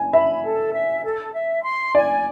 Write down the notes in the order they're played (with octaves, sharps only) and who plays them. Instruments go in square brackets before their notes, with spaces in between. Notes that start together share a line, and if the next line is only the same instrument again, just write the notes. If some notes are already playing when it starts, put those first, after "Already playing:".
Already playing: [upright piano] G#5
[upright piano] E5 [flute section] B5
[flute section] A4
E5
A4
E5
C6
[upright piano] D5 [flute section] G#5